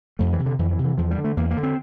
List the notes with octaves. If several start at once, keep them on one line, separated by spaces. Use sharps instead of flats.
F2 A3
E3
C3
D3
F2 E3
E3
C3
E3
E2 F3
G3
D3
A3
E2 A#3
A#3
D3
C4